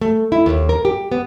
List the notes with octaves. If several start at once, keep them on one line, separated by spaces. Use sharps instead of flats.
A3
E4
D#2
A#4
G4
B3